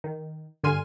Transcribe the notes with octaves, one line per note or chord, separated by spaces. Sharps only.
D#3
G2 D3 G#5 C6 F6 D#7